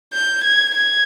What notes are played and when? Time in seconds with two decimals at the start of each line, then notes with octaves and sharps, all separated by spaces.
0.13 G6
0.44 G#6
0.75 G#6